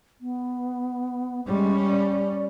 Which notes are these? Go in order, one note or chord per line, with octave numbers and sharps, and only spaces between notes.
B3
G3 G#3 C#4
D5